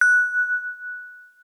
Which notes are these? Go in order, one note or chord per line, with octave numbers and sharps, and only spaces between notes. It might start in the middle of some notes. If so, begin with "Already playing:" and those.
F#6